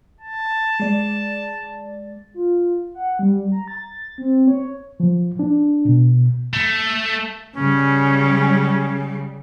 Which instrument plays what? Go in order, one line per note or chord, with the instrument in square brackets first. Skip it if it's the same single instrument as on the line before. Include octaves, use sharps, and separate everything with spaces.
[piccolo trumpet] A5
[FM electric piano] G#3 D5 A6
[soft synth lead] F4
F#5
G3
A#5
A6
C4
C#5
[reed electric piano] F3
D4
B2
[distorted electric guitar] A3
[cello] C#3 G3 [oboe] C#4